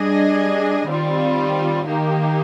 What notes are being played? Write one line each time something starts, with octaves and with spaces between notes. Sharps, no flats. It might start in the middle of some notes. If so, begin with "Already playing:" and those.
Already playing: G3 D4 G#4 D#5
D#3 G3 C4 F4
D#3 A#3 D#4 G4